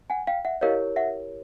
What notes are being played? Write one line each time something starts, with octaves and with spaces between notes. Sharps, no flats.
F#5 G#5
F5 G5
E5 F#5
E4 G4 A#4 C#5 D#5 F5
E5 F#5